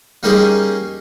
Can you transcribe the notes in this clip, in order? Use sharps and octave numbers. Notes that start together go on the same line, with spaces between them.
G3 A#3 C#4 D#4 G4 G#4